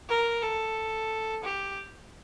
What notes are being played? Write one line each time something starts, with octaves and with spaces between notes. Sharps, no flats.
A#4
A4
G4